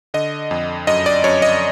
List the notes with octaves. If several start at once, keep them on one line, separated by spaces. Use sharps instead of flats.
D3 D#5
F2
F#2 D#5
D5
F#2 C#5
D#5